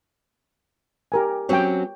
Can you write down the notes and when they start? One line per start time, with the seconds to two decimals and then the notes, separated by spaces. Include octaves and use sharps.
1.12 G4 A#4 G#5
1.49 F#3 C4 C#4 C#5 G5